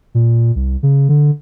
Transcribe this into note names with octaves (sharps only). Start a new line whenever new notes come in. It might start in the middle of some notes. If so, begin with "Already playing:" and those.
A#2
C2
C#3
D3